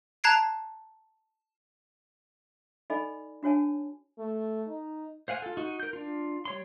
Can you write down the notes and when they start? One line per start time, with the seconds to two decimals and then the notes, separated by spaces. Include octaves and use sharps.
0.24 A5 A#5 F#6 G#6 C7 D7
2.90 D#4 A4 D5 D#5 G#5 B5
3.43 D4 F#4 C#5 G#5 A5
4.19 A3
4.68 D#4
5.28 C5 F5 F#5 G#5
5.42 F4 A4
5.57 D#4 F#4
5.80 A#4 G6
5.93 D4 F4
6.45 G3 C#5 C6